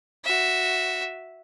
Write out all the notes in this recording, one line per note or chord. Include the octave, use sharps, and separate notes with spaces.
F#4 E5